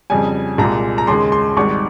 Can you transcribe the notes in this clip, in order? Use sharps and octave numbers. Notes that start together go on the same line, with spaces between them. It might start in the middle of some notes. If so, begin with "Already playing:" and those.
F2 C#3 G3 G#5
C2 A#2 G#3 A#5
A#5
D#2 C#3 G#3 C6
C6
G#1 G#2 G3 C#6